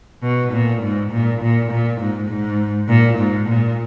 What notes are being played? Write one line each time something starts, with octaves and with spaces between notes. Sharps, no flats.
B2
A#2
G#2
A#2
A#2
A#2
G#2
G#2
A#2
G#2
A#2